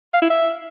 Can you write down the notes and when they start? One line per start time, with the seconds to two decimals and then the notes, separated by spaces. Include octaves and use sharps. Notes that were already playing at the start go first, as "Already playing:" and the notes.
0.13 F5
0.22 E4
0.30 E5